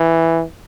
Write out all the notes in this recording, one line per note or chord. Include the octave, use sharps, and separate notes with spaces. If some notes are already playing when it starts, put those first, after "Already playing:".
Already playing: E3